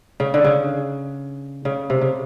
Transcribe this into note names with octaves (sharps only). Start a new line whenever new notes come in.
C#3
D3
C#3
C#3
C3
C#3